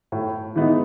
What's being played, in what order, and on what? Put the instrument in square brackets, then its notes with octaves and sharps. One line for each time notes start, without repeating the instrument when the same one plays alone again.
[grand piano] A2
E3 G#3 B3 D#4